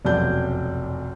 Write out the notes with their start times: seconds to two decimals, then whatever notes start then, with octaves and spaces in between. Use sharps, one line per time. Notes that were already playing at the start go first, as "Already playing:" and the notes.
0.05 F1 B1 F#2 F#3 D5 G6